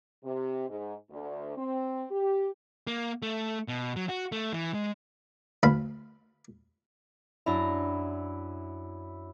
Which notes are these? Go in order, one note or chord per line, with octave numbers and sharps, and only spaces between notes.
C3
G#2
D2
C4
G4
A#3
A3
B2
F#3
F#4
A3
E3
G#3
D2 B4 F5 B5
F#2 D4 E4 A#5